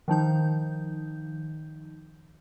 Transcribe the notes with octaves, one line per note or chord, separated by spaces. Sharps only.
D#3 F3 D#4 G6